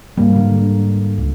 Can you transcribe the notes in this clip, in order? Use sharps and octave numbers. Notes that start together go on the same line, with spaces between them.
G#2 G3 A#3
D3
C#2